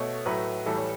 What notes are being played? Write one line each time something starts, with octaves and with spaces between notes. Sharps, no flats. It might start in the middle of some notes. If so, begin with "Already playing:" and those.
Already playing: B2 A3 C#5
A2 F#3 A3 B4
A2 E3 G3 A4
C#5